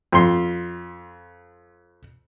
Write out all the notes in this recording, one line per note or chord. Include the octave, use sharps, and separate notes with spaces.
F2 C6